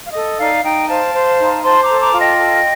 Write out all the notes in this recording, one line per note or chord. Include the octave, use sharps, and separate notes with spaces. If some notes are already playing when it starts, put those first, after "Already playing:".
F5
A4 D#5
D#4 D5 F5
D#4 D#5 G5
C5 F5 A5
C5
D#4
C5 A5 C6
A#5 D6
A4
A#5 D6
F4
D#5 G5
A4